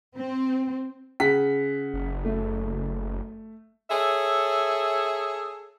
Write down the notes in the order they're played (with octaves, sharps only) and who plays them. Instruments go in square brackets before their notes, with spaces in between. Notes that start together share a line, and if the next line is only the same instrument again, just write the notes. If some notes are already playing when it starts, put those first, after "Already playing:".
[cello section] C4
[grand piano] C#3 F#5 B6
[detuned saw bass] F#1
[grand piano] A3
[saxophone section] G#4 A4 C#5 E5